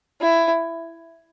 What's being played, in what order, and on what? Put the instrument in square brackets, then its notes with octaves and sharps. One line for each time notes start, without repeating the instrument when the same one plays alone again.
[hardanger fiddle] E4